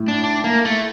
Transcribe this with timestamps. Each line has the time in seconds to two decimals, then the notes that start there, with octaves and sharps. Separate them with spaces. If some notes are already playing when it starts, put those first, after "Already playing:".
Already playing: A2
0.08 D4
0.24 D4
0.44 A#3
0.65 A3